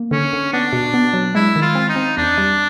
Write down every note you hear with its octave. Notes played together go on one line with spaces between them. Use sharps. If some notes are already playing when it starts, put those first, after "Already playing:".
Already playing: A#3
D3 C#4
D3
B3 D4
B2
B3
F#3
G#3 E4
D#3
F4
C4
D#4
C4
E2 D4
G3